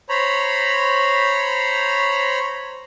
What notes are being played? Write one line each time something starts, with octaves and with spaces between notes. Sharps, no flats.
C5 C#5 A#5 B5